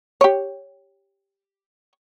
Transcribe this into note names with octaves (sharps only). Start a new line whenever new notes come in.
G4 C#5